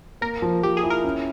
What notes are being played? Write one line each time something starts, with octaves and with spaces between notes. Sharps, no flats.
A#3 A#4
F3
F3 G4
G#4
E4
A#4
C#4